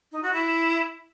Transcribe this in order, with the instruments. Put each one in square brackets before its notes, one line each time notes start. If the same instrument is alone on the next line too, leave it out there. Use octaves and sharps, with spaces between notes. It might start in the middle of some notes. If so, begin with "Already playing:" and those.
[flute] D#4
F#4
E4